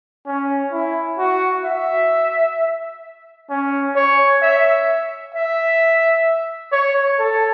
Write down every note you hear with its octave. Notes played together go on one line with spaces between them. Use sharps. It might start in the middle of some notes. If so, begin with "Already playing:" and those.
C#4
E4
F#4
E5
C#4
C#5
E5
E5
C#5
A4